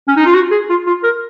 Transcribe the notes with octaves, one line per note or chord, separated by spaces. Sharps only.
C#4
D#4
F4
F#4
G#4
F4
F4
A#4